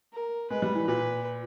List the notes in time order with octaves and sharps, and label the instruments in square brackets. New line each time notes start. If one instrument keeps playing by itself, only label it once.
[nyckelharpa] A#4
[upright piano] G#3 [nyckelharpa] B4
[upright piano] G3
E3
[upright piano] A#2 [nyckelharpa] B4